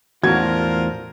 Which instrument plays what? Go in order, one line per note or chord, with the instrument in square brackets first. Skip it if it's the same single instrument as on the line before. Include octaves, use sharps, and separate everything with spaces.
[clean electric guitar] E2 A2 D4 [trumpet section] F4 A#4 C5 [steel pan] F#4 [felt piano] G#6